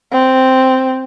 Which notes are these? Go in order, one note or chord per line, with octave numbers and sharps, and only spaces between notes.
C4